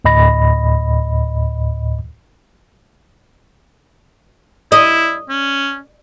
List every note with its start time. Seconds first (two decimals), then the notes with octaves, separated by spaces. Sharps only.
0.05 D2 A2 D#5 B5 A#6
4.72 E4 D#5
5.30 C#4